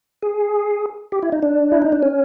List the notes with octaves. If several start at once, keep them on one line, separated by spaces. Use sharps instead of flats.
G#4
G4
E4
D#4
D4
E4
D#4
D4
C#4